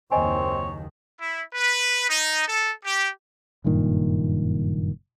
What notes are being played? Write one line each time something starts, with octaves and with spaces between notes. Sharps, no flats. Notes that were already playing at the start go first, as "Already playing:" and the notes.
F#1 D#2 D#3 C4 C#5 D#5 G#5
E4
B4
D#4
A4
G4
F#1 G2 A#2 D#3